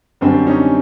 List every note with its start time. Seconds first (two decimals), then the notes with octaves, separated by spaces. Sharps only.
0.21 F#2 D3 G3 C4 D4
0.47 C#4 D#4